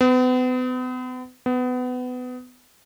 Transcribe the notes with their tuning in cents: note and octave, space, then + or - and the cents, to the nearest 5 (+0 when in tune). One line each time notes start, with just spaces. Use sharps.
B3 +40
B3 +25